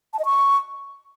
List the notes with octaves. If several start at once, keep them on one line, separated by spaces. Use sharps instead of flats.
A5
D#5
C#6